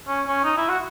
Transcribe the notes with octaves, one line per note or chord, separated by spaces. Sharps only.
C#4
C#4
D#4
E4
F#4